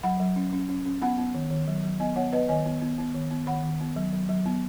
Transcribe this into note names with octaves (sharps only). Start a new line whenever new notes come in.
F#3 F#5 B5
F#3
C#4
C#4
C#4
C#4
B3 F#5 B5
B3
D#3
D#3
F#3
F#3
B3 D#5 G#5
B3 C#5 F#5
B3 B4 D#5
D#3 D#5 G#5
B3
B3
B3
D#3
B3
D#3 F#5 B5
D#3
B3
F#3
F#3
F#3
B3